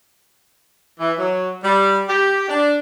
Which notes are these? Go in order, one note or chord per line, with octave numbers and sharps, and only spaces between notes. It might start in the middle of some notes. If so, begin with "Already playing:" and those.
E3
F#3
G3
G4
D4